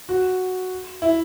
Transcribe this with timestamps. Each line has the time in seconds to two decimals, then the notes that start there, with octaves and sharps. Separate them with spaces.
0.09 F#4
1.02 E4